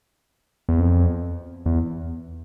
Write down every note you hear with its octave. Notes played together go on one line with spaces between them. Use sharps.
E2
F2
E2